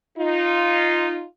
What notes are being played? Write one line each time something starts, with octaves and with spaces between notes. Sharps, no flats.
D#4 F4